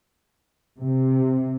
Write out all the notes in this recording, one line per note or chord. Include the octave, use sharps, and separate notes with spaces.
C3